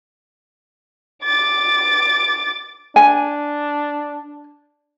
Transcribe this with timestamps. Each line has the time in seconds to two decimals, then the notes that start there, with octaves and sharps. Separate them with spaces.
1.24 D6 A6
2.96 D4 G#5